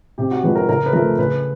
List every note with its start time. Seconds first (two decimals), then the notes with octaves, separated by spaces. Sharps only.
0.18 C3 G4
0.31 F#4
0.43 F3 G#3 B4
0.55 A#4
0.69 C#3 A#4
0.86 B4
0.93 F3 A3 A#4
1.18 C#3 B4